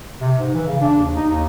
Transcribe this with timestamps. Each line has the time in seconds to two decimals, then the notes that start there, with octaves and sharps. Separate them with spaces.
0.21 C3
0.38 G#2
0.54 E3
0.67 C#3
0.81 D4
0.98 D#2
1.15 D#4
1.28 D#2